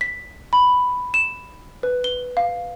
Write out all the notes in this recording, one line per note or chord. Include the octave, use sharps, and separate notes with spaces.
B6
B5
E7
B4
G7
F5